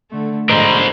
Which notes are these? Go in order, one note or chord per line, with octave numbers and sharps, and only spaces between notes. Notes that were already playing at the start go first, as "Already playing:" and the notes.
D3 A3
G#2 D3 A#4 C5 D#5